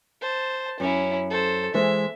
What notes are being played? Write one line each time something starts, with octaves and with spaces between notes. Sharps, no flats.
C5 A5
F#2 C#4 E4
A4 C5
E3 G#3 C5 E5